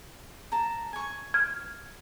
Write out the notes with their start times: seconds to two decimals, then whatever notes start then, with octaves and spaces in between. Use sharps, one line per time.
0.52 A5 A#5
0.93 G#5 C#6
1.34 F6 G#6